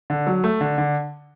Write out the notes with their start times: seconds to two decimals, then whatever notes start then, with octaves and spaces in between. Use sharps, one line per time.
0.10 D3
0.27 F#3
0.44 A3
0.61 D3
0.78 D3